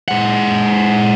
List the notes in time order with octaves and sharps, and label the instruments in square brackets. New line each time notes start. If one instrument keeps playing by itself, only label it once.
[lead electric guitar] G#3 F#5